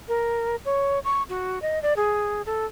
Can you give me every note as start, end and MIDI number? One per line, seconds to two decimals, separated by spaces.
0.08 0.56 70
0.65 0.99 73
1.04 1.23 85
1.29 1.61 66
1.62 1.81 75
1.82 1.94 74
1.97 2.42 68
2.46 2.65 69